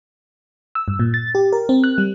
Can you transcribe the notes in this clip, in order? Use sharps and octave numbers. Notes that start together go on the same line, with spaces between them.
E6
G2
A#2
A6
G4
A#4
C4
F#6
G3